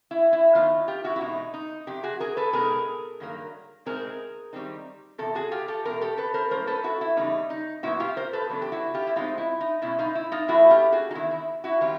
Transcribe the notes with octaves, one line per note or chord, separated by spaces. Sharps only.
E4
E4
D#3 F#3 B3 D#4 F4
F4 G4
E4 F#4
E4
E2 B2 G#3 D#4
D#4
F2 C3 G4
F#4 G#4
G#4 A#4
A4 B4
B2 G#3 B3 D#4 G#4 A#4
G2 D#3 F#3 A#3
B2 G#3 C4 D#4 G#4 A#4
D#3 G3 C4 D#4
E2 C3 A4
F#4 G#4
F4 G4
G4 A4
E2 B2 G#3 A#4
G4 A4
A4 B4
A#4 C5
A2 F#3 A#3 C#4 A#4 C5
A4 B4
E4 F#4
E4
E2 C#3 G3 D#4
D#4
A#2 F#3 B3 E4 F#4
F4 G4
A#4 C5
A4 B4
E2 C#3 F#3 B3 D4
G4
E4 F#4
F4 G4
E4
A2 F3 G#3 C4 D#4 F4
E4
D#4
B2 G#3 C#4 E4
D#4 F4
E4
D#4 F4
A2 E3 A3 E4 F#4
F4 G4
F#4 G#4
D#4
E2 C3 D#3 E4
E4
E4 F#4
D#3 G3 C4 F4 G4